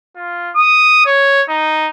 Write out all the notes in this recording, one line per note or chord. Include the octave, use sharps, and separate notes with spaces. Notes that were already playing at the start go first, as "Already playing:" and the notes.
F4
D#6
C#5
D#4